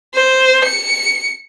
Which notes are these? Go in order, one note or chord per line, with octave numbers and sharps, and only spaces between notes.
C5
C#7